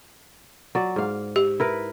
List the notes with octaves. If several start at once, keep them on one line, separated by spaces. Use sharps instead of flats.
F#3 D5
G#2 F5
G4
E4 A#4 B4